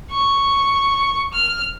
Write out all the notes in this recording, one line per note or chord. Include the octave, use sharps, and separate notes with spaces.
C#6
F6